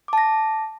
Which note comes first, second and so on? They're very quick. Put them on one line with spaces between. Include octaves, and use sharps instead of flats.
D6 A5 A#6